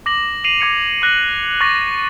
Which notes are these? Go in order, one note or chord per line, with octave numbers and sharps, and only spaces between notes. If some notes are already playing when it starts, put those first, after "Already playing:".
D6 A#6 F#7
C7 D#7 F7 F#7
D6 G#6 C#7 F7
D6 F#6 A#6 F#7
C#6 D6 F#6 A6 A#6